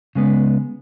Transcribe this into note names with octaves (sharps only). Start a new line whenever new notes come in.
C#3 G#3 B3